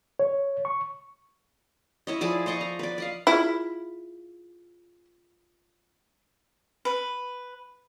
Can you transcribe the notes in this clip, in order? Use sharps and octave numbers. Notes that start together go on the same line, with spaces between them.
C#5
C#6
E4 C#5 D#5
F3 E4 G#4 D5
C5 D5 D#5 C#6
A#5
B4 D5
D5 D#5 F5
E4 F4 G#4
B4